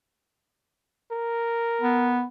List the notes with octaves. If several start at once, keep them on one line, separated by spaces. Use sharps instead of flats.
A#4
B3